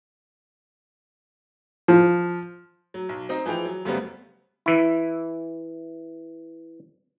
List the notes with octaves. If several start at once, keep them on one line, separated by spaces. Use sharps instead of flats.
F3
F#3
B1
C4 D#4
E3 F3 G#4 G5 F7
F#3
F#2 C#3 G3 A3 B3 C4
E3 E4